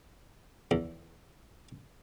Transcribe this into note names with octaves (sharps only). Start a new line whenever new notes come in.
E2